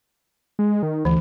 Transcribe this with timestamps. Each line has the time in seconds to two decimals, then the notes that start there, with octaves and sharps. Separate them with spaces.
0.59 G#3
0.83 D#3
1.05 D2 E3